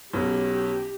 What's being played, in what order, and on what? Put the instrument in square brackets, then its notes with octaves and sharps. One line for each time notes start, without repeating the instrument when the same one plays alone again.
[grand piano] B1 B3 C#4 [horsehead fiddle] G4